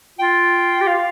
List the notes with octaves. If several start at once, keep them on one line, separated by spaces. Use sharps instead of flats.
F4 G5
G4
F4 F5